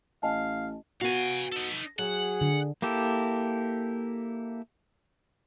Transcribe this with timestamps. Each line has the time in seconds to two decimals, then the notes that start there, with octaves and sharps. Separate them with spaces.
0.23 A1 D#5 F5 G#5 A5
1.01 B3 F#4 F5 G#5
1.52 D#4 A4
1.99 F#3 G#4 F#5
2.41 D3
2.82 A#3 E4 G4 A4